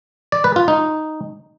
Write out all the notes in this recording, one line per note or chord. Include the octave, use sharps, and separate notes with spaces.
D5
B4
F4
D#4